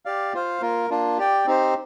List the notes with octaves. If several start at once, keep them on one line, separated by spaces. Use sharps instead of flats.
G4 D5 F5
F4 C5 F5
A#3 F4 A#4
A#3 D4 F4
G4 D5 G5
C4 D#4 G4 C5